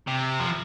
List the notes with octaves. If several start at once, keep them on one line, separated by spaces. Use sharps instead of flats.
C3
F3